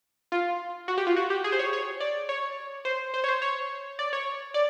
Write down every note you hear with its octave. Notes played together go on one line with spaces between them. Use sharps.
F4
F#4
G4
F4
F#4
G4
G#4
C5
C#5
C#5
D5
C#5
C5
C5
C#5
C5
C#5
D5
C#5
D5